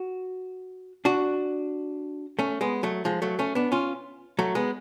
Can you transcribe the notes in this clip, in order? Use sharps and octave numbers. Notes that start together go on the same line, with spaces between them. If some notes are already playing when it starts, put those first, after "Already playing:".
Already playing: F#4
D4 F#4
A3 C#4
G#3 B3
F#3 A3
F3 G#3
F#3 A3
A3 C#4
B3 D4
C#4 F4
F#3 A3
G#3 B3